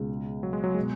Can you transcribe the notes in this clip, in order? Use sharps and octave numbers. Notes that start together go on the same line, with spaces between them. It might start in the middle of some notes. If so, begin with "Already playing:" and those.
Already playing: C#2 B2 G#3
F#3
G#3
F#3
B2 G#3